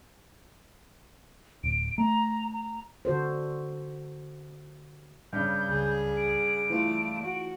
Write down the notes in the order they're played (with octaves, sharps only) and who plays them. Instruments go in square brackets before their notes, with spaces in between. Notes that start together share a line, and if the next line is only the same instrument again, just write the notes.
[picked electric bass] D1 [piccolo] D7
[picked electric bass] A3 [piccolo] A#5
[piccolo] A#5
[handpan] D3 F#4 A4 C5
[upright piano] G2 C#3 [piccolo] G6
[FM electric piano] C#2 [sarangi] G#4
[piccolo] D7
[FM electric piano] E3 F4 [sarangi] A3
[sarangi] F#4